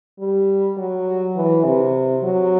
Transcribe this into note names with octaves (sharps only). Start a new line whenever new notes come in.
G3
F#3
E3
C3
F#3